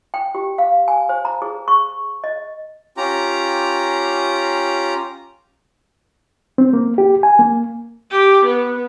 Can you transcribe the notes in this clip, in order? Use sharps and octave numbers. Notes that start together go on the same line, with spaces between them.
G5
G4
F5
G#5
C5
A#5
G#4
C#6
D#5
C#4 F4 G4 A#5
C4
A#3
G4
G#5
A#3
G4
B3